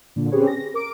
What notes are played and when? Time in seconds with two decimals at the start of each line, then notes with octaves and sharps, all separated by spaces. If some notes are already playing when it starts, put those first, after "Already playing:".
0.16 A#2 D3
0.31 C4 C#4 G4 G#4 B4 C#5
0.47 A#6
0.74 A#4 D6 D7